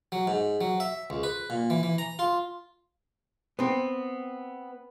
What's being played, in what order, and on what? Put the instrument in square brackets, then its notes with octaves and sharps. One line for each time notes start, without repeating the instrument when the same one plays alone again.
[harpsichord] F#3
G#2
F#3
E5
C#2
B4
A#2
E3
E3
A#5
F4
[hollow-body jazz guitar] B3 C4